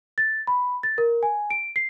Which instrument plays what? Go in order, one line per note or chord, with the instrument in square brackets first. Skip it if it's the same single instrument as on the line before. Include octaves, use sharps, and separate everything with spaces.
[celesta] A6
B5
A6
A#4
G#5
D7
C7